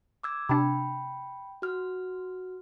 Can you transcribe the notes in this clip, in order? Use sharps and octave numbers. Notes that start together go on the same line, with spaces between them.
D6 E6 G#6
C3 D4 G5 B5
F#4 F6